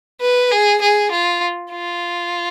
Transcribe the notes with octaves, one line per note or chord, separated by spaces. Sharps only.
B4
G#4
G#4
F4
F4